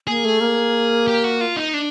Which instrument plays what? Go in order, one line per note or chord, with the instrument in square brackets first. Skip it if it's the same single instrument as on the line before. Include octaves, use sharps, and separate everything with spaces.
[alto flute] A#3 [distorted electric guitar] G#4
[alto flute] A3
A#3
[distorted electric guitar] G4
F#4
F4
D#4
D4